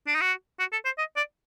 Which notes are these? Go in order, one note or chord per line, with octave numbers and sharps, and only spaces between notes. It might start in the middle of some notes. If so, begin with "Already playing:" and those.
D4
D#4
F#4
F#4
A4
C5
D#5
D5